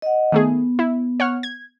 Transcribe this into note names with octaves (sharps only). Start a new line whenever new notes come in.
D#5 F#5
D#3 A3 B3 G#4
E4
C#5 F#5 F6
G#6